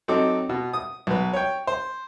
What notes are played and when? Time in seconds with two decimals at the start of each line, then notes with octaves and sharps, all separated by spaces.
0.08 F#3 C4 D#4 A4 D6
0.49 B2
0.73 D#6
1.07 B1 B4
1.33 C#5 G5
1.67 C5